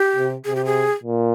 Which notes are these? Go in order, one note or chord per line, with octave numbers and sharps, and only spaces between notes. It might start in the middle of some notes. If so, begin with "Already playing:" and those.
Already playing: G4
C3
C3 G#4
G4
G#4
A#2